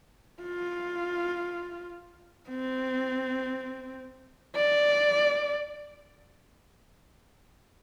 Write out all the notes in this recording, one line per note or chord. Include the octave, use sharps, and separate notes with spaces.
F4
C4
D5